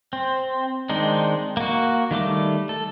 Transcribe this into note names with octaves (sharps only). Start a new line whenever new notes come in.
C4
D#3 G#3 C4 D4 D#4
A#3 F#4
D#3 G3 A3 D6
A4